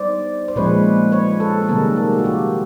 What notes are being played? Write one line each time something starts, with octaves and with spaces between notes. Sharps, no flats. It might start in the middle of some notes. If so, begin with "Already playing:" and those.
Already playing: G3 B3 D#4 C5 D5
C5
A#2 F3 G#3 C#4 B4 C#5
B4 C#5
A4 B4
A4
C3 D#3 G3 A#3 G#4 A#4
G4 A4
F#4
F4 G4